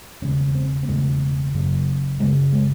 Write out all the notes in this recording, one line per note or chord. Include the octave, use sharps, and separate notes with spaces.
E1 D#2 C#3 C#4
C4
C4
E1 D#2 C#3 A3
F#1 F#2 C#3
F#1 F#2 C#3 G#3
G#3